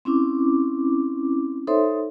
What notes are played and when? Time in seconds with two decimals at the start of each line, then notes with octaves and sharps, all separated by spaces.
0.05 C4 C#4 E4 D6
1.67 D#4 A4 C5 C#5 E5 C6